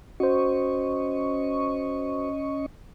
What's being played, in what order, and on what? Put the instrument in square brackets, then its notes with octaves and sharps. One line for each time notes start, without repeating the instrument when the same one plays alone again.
[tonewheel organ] C#4 D#5 C#6 [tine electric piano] F#4 C5